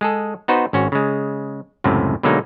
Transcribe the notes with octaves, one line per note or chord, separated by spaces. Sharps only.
G#3 G#4 A4
B3 D#4 F#4 B4 C5
G#1 C#4 F#4
C#3 G#3
C#2 F#2 A2 C3
B2 D3 F#3 G#3 A#3 D#4